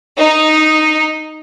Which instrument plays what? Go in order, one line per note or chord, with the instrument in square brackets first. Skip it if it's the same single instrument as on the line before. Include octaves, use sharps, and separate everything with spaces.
[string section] D#4